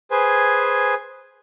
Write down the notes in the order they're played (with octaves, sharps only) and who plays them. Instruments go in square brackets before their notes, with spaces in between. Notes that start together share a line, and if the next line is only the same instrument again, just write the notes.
[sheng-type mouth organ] G#4 B4 C5 G#5